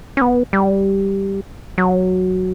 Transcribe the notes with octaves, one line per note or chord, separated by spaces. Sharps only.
C#4
B3
G3
F#3